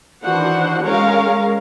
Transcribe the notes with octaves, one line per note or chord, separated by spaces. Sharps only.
D#3 E3 D4 F#4 C5 F#5
G#3 C#4 A#4 C#5 F5 A#5